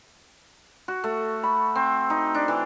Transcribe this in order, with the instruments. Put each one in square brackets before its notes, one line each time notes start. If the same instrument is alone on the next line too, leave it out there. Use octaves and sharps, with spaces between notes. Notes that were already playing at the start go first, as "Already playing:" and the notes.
[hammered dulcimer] F#4
A3
B5
C4
D#4
D4
E3